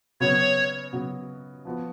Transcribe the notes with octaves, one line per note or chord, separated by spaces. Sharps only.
C#3 F#3 B3 F#4 C#5
C#3 F#3 B3 F#4
F3 B3 F#4